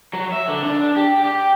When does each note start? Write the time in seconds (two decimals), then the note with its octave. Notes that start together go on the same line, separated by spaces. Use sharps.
0.13 F#3
0.32 E5
0.48 D3
0.64 D4
0.97 G4
1.25 G4